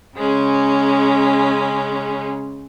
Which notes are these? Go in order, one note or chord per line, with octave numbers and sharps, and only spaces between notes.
C#3 G#3 C#4